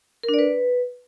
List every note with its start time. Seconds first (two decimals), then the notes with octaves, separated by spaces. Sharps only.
0.23 A#4
0.29 D4
0.34 D5
0.39 B4